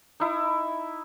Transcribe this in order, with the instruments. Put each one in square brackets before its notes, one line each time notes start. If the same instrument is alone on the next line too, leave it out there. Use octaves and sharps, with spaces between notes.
[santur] D#4 E4